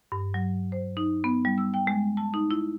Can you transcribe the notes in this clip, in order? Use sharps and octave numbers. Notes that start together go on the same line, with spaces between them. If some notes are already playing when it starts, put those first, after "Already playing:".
G2
F#3
C5
D#4
B3
G3
E6
G5
G#3
A5
D#4
E4